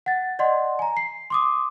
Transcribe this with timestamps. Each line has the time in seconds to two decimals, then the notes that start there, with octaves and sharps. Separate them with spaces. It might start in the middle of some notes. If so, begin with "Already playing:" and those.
0.06 F#5 A6
0.39 D5 D#5 F#5 C6
0.79 G#5 A#5
0.97 C7
1.30 C6 D6 D#6